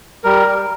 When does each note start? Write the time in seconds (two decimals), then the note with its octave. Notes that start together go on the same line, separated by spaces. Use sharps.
0.24 G3 A#4
0.47 G3